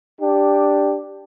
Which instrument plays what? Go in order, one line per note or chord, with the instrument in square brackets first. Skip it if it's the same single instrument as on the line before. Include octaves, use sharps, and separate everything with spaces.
[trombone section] D4 G4